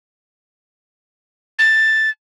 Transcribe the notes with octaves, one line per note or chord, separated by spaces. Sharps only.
A6